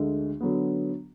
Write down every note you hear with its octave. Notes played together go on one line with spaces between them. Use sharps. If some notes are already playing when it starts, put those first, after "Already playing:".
Already playing: D2 D3 G#3
D3 F#3 B3